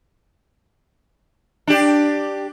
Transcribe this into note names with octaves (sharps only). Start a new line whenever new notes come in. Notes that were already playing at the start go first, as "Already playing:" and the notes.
D4 G4